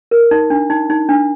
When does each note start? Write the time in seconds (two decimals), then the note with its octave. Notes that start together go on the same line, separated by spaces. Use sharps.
0.11 A#4
0.31 D#4
0.50 D4
0.70 D#4
0.90 D#4
1.09 D4